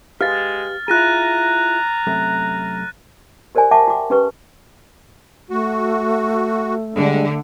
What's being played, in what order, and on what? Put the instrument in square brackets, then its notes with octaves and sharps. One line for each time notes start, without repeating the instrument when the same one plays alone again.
[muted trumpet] G#3 [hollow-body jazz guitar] G4 B4 F5 [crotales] F6 A6
[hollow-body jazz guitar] E4 F4 G#4 [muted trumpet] A#5 [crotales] F#6 A#6 D#7
[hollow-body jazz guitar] F#2 C3 A3
[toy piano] G4 A#4 C5 D5 G#5
E5 F#5 G5 A5 C#6 D6
F#4 D6
C#4 G4 B4 C#6
[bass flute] A3 [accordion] F#4
[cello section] D3 [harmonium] G3 G#3 D4